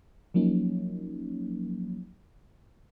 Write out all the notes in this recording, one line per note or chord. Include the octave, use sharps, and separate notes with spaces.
F3 F#3 A#3 C#4 D#4